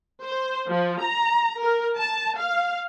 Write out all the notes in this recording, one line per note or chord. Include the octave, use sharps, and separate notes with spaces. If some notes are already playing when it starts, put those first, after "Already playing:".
C5
F3
A#5
A#4
A5
F5